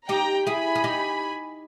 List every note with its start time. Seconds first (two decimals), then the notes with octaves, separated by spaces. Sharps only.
0.09 D#4 G4 G5 A#5
0.46 E4 G#4 G#5 B5
0.75 G#4
0.84 D#4 G4